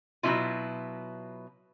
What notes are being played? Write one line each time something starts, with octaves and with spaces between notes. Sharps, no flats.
B2 F#3 C4 C#4 E4 F4